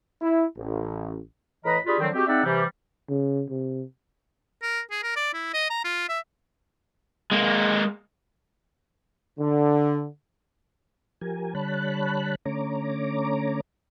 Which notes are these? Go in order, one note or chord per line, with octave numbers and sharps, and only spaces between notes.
E4
A1
A2 E3 B4 D#5 A#5 B5
D4 F4 G4 G#4 B5
D3 D#3 F3 F#3 C4
G#3 C4 F#4 G4
G#3 C4 D#4 D5 E5 F#5
C3 E3 G3
C#3
C3
A#4
G#4
A#4
D5
E4
D#5
A#5
F4
E5
G#3 A#3
D3
F3 G4 A#4 G#5
D3 G3 C#5 A5 B5 F#6
D3 A3 C#4 C#5 A#5 D6